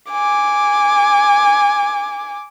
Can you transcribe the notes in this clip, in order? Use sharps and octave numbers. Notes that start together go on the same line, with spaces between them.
G#5 D6